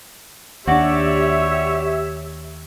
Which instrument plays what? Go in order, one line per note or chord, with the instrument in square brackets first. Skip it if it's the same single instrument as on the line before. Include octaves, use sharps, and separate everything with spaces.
[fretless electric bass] D#2 D4 [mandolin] F#4 D5 [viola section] G4 E5 [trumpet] C#5